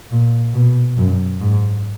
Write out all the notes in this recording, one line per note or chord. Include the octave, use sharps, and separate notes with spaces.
A#2
B2
F#2
G#2